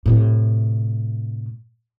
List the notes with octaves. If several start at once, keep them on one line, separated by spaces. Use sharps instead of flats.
A2 C3